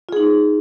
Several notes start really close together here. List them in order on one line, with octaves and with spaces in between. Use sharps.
F4 G#4 D#4